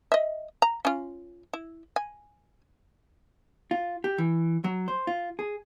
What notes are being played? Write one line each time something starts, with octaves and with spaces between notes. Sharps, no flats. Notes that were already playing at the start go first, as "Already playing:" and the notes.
D#5 E5
A#5
C#4 F4
E4
G#5
F4
G4
E3
F#3
C5
F4
G#4